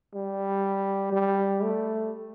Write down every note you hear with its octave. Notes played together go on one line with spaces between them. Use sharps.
G3
G3
A3